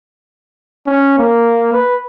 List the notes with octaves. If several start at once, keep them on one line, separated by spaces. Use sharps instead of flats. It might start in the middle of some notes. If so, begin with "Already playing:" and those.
C#4
A#3
B4